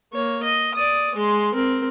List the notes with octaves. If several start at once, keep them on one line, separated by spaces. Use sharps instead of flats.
A#3 C#5
D#5
D5 D#6
G#3 C6
C4 A#4